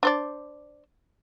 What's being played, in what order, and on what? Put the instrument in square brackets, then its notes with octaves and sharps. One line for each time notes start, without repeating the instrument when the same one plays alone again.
[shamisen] D4 C5 D5